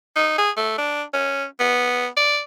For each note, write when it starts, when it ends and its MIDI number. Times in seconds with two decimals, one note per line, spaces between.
0.16 0.35 63
0.38 0.51 68
0.57 0.75 57
0.78 1.02 62
1.14 1.45 61
1.60 2.07 59
2.17 2.40 74